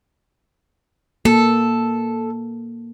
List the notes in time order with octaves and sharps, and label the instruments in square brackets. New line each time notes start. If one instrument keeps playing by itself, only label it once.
[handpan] A#3 [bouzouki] A4